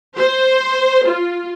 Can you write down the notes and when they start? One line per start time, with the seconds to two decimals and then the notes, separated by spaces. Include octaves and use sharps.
0.16 C5
1.05 F4